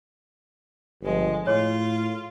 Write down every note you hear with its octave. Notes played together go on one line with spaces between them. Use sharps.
G1 F3 G#3
A2 F4 G#4 C#5